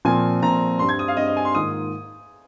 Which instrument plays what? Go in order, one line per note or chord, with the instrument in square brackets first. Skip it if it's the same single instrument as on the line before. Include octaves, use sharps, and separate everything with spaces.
[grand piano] A#2 F3 C4 [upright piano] G#5
[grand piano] A#2 F3 C4 [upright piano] A#5
[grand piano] G2 G3 C4 [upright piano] C6
[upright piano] G#6
D#6
F5
[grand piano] G2 G3 C4 [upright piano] D#5
[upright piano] D#5
G#5
C6
[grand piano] G#2 D#3 A#3 F4 [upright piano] D#6